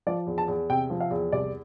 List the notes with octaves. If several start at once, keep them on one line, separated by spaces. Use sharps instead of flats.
F3 D5
E2
A5
E2
C3 G5
F3
F5
E2
C2 D5